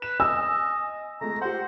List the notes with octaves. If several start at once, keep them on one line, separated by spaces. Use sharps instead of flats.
B4 E7
D#5 G#5 E6
G#3 A3 A#5
G4 C5 F#5